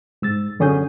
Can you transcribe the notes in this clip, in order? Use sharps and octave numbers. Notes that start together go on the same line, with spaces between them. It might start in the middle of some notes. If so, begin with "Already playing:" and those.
G#2 E6 A6
F#2 D3 C#4 G#4 D#6 G6